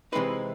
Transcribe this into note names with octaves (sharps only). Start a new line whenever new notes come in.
C3 E3 G#3 C4 D#4 B4